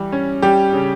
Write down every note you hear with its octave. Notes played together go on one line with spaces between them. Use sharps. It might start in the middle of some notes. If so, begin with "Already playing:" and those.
Already playing: E3 G3
C#4
G3 G4
C#3